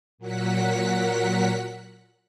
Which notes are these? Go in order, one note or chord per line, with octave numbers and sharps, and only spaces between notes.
A#2 F#3 A#3 F#5 F#6 B6